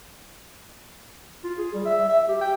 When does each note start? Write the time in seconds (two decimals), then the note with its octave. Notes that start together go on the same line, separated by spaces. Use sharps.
1.44 F4
1.58 G#4
1.74 G3
1.86 E5
2.09 E5
2.29 G4
2.41 G5